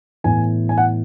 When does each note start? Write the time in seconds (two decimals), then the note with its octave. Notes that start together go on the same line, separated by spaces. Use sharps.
0.24 A2 E3 B3 G#5
0.69 G#5
0.78 F#5